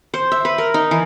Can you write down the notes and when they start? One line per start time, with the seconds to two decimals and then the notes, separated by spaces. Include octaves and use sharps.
0.14 C5
0.32 E5
0.45 B4
0.58 A#4
0.74 D#4
0.91 E3